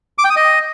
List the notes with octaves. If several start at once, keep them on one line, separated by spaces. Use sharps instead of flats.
D6
G5
D#6
D#5